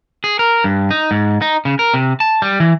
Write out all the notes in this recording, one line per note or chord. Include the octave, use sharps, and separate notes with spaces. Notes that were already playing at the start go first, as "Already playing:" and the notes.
G#4
A#4
G2
D#4
G#2
D#4
C#3
A#4
C3
A5
G3
E3